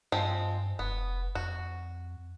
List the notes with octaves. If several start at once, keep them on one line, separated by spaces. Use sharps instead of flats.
G2 F3 G#3 C4
F1 B3
F2 F#4